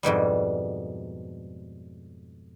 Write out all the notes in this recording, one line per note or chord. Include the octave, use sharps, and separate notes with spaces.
F2 G#2 B2 G3